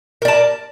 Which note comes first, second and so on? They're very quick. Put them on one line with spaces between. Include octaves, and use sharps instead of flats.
A#4 D5 A5